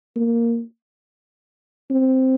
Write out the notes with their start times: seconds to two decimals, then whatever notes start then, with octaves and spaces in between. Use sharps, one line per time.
0.16 A#3
1.91 C4